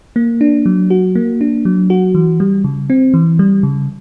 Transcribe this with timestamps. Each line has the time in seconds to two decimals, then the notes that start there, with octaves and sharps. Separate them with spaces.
0.16 A#3
0.41 D4
0.66 F#3
0.90 F#4
1.15 A#3
1.41 D4
1.65 F#3
1.90 F#4
2.15 E3
2.40 G3
2.64 C#3
2.90 C4
3.14 E3
3.39 G3
3.63 C#3